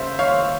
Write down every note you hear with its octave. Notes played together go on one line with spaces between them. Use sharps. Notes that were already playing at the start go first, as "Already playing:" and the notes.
Already playing: C#3 G3 C#4 C5 E5 F5
C#5 F5